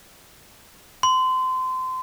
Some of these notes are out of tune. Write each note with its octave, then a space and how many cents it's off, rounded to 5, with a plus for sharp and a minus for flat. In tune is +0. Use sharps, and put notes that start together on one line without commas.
C6 -25